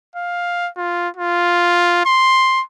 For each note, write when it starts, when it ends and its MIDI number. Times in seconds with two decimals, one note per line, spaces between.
0.16 0.69 77
0.77 1.09 65
1.17 2.02 65
2.06 2.62 84